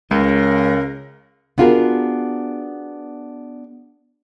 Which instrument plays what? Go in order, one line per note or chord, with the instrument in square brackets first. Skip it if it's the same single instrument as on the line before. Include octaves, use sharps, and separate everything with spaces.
[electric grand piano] C#2 [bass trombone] C#3 [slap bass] G#3 [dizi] A#4
[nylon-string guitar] B3 D4 F4 F#4 G#4 A#4